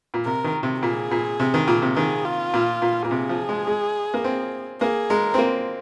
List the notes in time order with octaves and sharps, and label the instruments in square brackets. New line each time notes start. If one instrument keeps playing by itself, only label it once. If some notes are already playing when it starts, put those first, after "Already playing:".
[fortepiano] A#2
[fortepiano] C3 [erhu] A#4
[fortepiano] D#3
C3
[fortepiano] A#2 [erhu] G#4
[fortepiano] A#2
C3
D#3
A#2
C3
[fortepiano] D#3 [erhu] G#4
[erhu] F4
[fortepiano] A#2
A#2
A#2
[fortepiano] C3 [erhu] G#4
[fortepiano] F3
G#3
G#3
A#3
C4
[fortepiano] A#3 [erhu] G#4
[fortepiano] G#3 [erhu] A#4
[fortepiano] C4
A#3